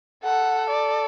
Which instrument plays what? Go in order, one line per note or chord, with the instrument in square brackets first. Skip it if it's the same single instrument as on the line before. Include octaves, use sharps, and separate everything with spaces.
[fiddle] A4 [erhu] F#5
[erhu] D5